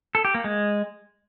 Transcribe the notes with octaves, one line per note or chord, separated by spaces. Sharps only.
A4
G4
A#3
G#3